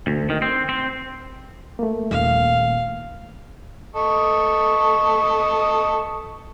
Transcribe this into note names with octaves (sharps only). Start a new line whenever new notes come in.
D2
D#3
C4
C4
A3 A#3
D#1 F5
A4 D#5 C#6